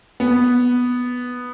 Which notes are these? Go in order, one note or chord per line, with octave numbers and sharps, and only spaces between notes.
B3